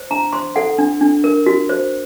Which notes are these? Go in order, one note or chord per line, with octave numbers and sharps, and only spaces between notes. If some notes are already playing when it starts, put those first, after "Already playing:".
Already playing: C5
D4 A#5
C5 C6
A4 F#5
D4
D4
A#4
F#4
C5